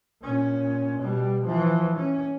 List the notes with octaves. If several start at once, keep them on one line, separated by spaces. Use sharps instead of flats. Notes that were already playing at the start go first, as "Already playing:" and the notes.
A#2 C#4
B2 G3
E3 F3
C#4